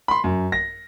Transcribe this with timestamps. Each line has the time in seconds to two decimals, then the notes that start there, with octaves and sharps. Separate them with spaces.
0.08 B5 C6
0.24 F#2
0.52 A#6